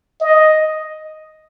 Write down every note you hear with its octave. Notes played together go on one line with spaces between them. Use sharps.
D#5